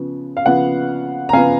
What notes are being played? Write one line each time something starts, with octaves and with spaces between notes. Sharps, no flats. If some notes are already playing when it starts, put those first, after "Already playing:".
Already playing: C#3 F3 B3
F5
C#3 F3 B3 F#5
A#5
C#3 F3 B3 F5 G#5